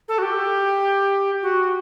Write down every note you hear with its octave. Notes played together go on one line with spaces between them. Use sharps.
A4
F#4
G4
F#4